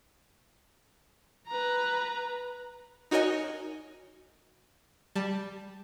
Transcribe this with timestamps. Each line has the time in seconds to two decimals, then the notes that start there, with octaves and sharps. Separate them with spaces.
1.48 B4 A#5
3.11 D#4 F#4 A#4 C#5 D#5 G#5
5.16 G3 A5